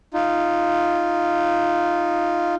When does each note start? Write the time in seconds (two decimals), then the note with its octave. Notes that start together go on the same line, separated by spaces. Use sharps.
0.14 D#4 F4